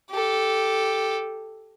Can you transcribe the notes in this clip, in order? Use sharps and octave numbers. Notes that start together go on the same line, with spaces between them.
G4 A4